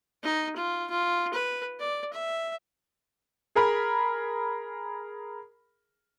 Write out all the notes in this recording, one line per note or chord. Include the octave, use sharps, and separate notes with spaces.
D#4
F4
F4
B4
D5
E5
G#4 A#4 B5